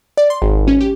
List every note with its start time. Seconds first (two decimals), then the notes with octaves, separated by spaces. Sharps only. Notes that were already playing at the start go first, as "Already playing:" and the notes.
0.17 D5
0.30 C6
0.42 G#1
0.68 C#4
0.81 G4